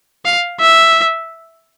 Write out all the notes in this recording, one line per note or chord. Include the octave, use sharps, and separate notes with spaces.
F5
E5